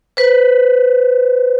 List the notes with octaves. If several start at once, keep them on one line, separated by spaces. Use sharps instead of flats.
B4 C5